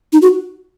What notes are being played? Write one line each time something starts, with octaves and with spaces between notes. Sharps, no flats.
D#4
F#4